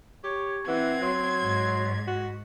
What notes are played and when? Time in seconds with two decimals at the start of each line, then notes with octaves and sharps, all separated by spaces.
0.24 G4 C#5
0.68 E3 C4 F#5 G#6
1.02 F#3 C6
1.42 G#2
2.07 F#4